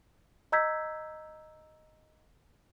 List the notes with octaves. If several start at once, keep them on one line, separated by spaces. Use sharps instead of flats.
D#5 A#5 E6 G6 G#6 B6